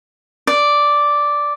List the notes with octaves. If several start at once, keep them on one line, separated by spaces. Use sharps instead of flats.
D5